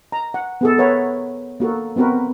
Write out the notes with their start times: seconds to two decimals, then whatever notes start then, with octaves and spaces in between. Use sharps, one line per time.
0.12 A#5
0.34 F#5
0.61 B3 G#4 A4
0.78 A#4 B4 C#5 E5 F#5
1.60 A#3 F#4 A4 A#4
1.96 B3 C4 F#4 A#4 B4